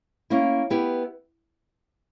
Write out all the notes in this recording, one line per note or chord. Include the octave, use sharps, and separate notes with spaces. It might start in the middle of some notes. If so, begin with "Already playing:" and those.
A#3 C#4 E4
B3 E4 G4 B4